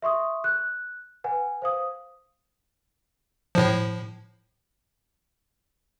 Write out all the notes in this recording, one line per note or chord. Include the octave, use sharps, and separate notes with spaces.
E5 C6 C#6 D#6
F#6
B4 F#5 G#5
C5 F5 D#6
A2 F3